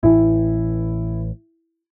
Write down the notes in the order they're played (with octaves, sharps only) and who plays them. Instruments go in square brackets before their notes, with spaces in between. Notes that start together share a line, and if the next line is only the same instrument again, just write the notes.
[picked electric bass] A1 A2 E3 [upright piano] E4